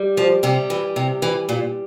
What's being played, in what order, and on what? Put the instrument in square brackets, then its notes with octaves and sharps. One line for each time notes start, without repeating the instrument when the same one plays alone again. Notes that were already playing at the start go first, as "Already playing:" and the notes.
Already playing: [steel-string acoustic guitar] G3
F3
C3 G3
E3
C3
E3
A#2